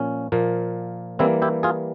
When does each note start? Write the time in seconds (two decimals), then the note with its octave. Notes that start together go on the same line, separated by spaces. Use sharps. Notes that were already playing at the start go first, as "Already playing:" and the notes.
Already playing: A#2 F3 A#3 C#4
0.32 A#2 F3 A#3
1.19 E3 G3 A#3 C4 E4
1.42 E4 G4
1.63 F4 G#4